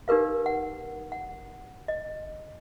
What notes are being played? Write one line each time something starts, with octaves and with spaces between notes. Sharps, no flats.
D#4 G4 A#4 B4 F5
F#5
F#5
D#5